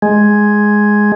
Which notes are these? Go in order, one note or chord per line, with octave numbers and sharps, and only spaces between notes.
G#3